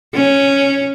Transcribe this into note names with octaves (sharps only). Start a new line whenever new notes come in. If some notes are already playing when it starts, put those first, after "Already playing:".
C#4